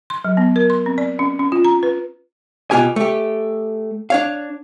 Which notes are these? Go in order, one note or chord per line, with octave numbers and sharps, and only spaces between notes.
C6
F#3
B3
A#4
C6
C4
D5
C#4
C#4
F4
A#5
B4
B2 E3 B3 F4 G4 G#5
A3 G4
D4 C#5 F5